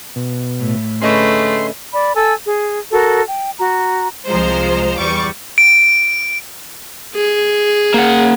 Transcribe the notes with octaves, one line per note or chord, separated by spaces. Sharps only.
B2
A2
D3 A3 C#4 G#4 B4 D#5 C6 C#6
D5 B5
A4 G#5 E6
G#4
F#4 A4 A#4
G5
F#4 A#5
C2 F3 G#3 F4 C5 A#5
E2 G3 C#6 D6
D7
G#4
A#3 F#5